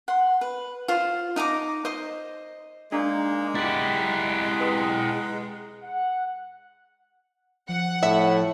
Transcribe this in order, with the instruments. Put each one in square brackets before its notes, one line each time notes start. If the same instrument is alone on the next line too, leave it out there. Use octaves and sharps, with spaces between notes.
[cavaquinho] F#5 C6
B4
F4 C5
D#4 D#5 A#5 D6
C5 D#5
[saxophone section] G#3 [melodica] A#3 D#4 [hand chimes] D4
[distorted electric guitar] E4 G4 [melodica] F#5 A#5 [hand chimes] A6
[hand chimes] B4 D#6
[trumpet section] F#5
[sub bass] F3 [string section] F#5
[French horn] A2 [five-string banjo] E5